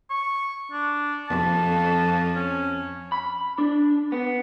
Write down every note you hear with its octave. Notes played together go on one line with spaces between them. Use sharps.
C#6
D4
F2 F3 A5
C#4
B5
D4
B3